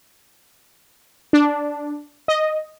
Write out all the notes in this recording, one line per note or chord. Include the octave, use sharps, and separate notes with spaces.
D4
D#5